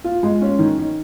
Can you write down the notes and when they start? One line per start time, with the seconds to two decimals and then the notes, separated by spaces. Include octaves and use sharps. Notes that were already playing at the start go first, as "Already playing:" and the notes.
0.04 F4
0.23 G#3
0.42 C#4
0.59 D#3
0.78 D#3